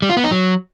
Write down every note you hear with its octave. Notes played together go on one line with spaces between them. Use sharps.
G3
F4
B3
D#4
F#3